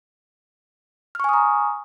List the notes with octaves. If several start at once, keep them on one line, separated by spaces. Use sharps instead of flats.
G#5 A#5 C#6 D#6 F6